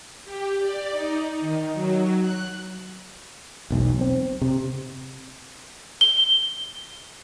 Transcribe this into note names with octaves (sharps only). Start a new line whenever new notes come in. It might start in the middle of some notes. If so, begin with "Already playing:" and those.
G4
D5
D#4
D#3
F#3
F#6
E1 B1
C4
C3
G7